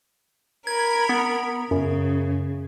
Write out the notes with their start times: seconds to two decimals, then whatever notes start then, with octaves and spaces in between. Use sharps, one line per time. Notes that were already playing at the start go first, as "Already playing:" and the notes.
0.67 A#4 B5 G#6
1.09 B3
1.71 F#2 C#3